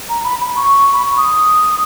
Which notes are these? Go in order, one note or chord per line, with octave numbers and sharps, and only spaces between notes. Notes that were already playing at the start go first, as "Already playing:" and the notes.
A#5
B5
B5
C#6
B5
C#6
D#6